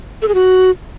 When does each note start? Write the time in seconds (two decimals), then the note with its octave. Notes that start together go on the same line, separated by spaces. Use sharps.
0.22 A4
0.28 G#4
0.35 F#4